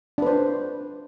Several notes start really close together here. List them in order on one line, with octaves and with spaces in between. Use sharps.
D4 B4 C5